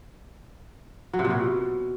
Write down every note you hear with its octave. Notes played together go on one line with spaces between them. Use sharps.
F#3
C3
A#2
B2